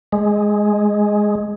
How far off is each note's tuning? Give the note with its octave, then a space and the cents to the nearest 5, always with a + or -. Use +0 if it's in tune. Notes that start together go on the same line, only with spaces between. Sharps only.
G#3 +0